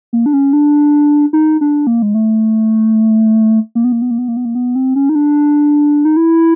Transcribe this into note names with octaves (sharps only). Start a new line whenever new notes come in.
A#3
D4
C#4
D4
D#4
D4
A#3
G#3
A3
A#3
B3
A#3
B3
A#3
B3
A#3
B3
A#3
B3
C4
C#4
D#4
D4
D#4
E4